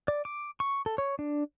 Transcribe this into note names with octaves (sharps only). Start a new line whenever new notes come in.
D5
D6
C#6
A4
C#5
D4